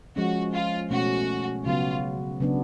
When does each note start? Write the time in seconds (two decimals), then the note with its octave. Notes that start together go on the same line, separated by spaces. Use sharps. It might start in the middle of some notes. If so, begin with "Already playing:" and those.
0.16 F3 G#3 C#4 F#4
0.54 F4
0.90 B2 A3 C#4 F#4
1.66 C#3 F#3 B3 F4 F#4
2.40 C#3 F#3 B3 D4